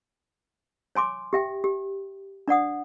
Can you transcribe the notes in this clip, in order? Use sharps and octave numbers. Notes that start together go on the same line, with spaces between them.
C#5 G#5 C6 D6
G4 E5 G5
G4
D4 D5 F#5 D#6